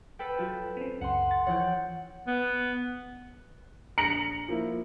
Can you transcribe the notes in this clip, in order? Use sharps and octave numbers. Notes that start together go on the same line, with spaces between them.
A4 B4 G5
F#3 F4
C4 C#4
C#2 F#2 F#5 C6
A6
E3 F3 C#5 F#5 G5
B3
A#1 A#5 C#7 F#7
F3 A#3 E4